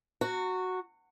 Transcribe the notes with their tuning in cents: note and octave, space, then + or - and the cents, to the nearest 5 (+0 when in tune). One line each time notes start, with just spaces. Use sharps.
F#4 +0 A#5 -35